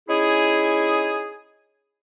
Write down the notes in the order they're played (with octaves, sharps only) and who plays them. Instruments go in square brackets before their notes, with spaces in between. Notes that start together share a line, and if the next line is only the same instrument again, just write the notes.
[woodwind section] C#4 D#4 E4 G#4